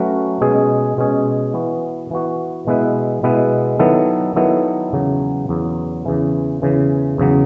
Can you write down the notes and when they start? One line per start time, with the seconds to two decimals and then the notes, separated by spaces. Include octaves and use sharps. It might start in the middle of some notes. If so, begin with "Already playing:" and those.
Already playing: F#3 A3 C#4 F#4 B4
0.41 B2 G#3 C#4 G#4
0.98 B2 G#3 C#4 G#4
1.54 E3 B3 F#4
2.11 E3 B3 F#4
2.67 B2 G#3 B3 E4 B4
3.23 B2 G#3 B3 E4 B4
3.79 D#3 F#3 B3 E4 A4
4.36 D#3 F#3 B3 E4 A4
4.93 E2 C#3 F#3
5.49 E2 C#3 F#3
6.05 E2 C#3 E3
6.62 E2 C#3 E3
7.18 E2 C#3 F#3